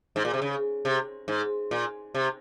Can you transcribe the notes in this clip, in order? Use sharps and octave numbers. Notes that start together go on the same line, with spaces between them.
G#2
A#2
C3
C#3
C3
G#2
A#2
C3